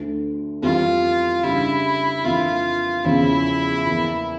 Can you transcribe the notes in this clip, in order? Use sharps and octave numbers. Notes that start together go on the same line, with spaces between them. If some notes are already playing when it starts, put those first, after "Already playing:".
Already playing: D2 D3 A3
F2 E3 G3 F4
C#3 G3 D4 E4
F2 E3 A#3 D4 F4
E2 C#3 F3 C#4 E4
E2 E3 A#3